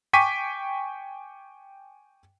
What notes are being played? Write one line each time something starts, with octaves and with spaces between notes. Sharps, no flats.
G5 G#5 C#6 D6 B6 D#7